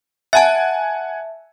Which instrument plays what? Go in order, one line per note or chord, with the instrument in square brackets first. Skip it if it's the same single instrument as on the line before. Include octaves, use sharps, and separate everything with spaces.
[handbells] E5 A5 [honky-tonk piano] F#5 G#5